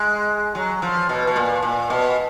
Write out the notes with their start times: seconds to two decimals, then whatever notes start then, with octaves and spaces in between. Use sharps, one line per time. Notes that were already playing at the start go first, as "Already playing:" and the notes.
Already playing: G#3
0.55 F#3
0.82 F3
1.09 B2
1.27 B2
1.36 A#2
1.62 A#2
1.90 B2